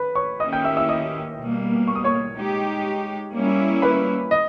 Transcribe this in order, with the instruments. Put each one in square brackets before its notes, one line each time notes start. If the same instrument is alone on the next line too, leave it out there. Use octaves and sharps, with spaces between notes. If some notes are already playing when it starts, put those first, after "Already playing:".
Already playing: [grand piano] B4 B5
C#5 C#6
[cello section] D#3 A#3 C#4 E4 G4 [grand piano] D#5 D#6
[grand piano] G5 G6
E5 E6
E5 E6
D#5 D#6
[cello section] B2 G3 A#3
[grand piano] C#6
D#6
C#5 C#6
[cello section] G#3 D#4 G4
G3 A#3 C#4 E4
[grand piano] B4 B5
D#5